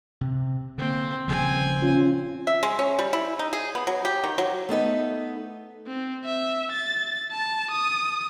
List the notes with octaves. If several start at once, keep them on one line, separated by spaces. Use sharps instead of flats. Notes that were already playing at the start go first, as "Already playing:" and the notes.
C3
D3 A#3 C4
D#1 C#3 F3 C4 G#5
C#4 F4
E5
G#3
C#4
G3
E4
D#4
G#4
B3
F#3
G4
D#3
F#3
A3 B3 D#4 B4
C4
E5
A6
A5
D#6